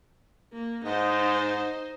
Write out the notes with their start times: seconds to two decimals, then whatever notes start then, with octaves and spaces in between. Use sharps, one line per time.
0.53 A#3
0.85 G#2 D#4 C5